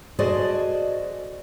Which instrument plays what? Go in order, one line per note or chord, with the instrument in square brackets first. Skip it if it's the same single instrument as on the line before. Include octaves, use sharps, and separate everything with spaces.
[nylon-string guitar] F#4 G#4 A4 C5 D5 D#5